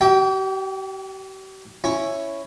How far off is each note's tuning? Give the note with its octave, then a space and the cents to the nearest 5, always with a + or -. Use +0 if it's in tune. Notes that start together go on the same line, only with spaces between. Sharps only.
G4 -45 E5 +0 G5 +0
C#4 +0 E4 +5